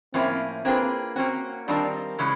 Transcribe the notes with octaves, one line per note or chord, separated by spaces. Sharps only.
A2 F3 A#3 C4 C#4 E4
A#3 C4 D4 F4 G#4 B4
A#3 C4 C#4 F#4
D#3 G3 C4 D4 F4 A#4
C#3 E3 G#3 C#4